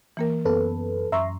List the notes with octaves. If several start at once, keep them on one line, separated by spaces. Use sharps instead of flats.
E3 A#3 A#4
F#2 B3 A4 B4
F#2 E5 A#5 C6 C#6 E6